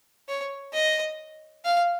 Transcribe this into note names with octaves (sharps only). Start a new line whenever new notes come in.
C#5
D#5
F5